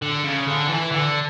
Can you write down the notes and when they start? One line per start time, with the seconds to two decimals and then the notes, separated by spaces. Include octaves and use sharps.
0.02 D3
0.24 C#3
0.48 D3
0.69 E3
0.92 D3